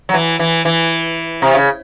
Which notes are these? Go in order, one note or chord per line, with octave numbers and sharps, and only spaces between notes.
F#3
E3
E3
E3
C3
C#3